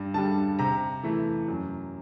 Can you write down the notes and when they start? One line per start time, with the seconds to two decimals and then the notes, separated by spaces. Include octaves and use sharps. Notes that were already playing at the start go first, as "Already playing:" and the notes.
Already playing: G2
0.14 D3 G3 A5
0.59 C3 A#5
1.03 E3 A3
1.48 F#2